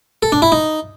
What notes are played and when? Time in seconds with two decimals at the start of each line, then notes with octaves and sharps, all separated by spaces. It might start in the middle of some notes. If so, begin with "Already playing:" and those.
0.23 A4
0.32 D4
0.42 E4
0.52 D#4